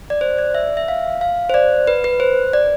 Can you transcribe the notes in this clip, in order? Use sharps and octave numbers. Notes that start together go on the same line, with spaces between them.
D5
C5
D5
E5
E5
F5
F5
C5
D5
B4
B4
C5
D5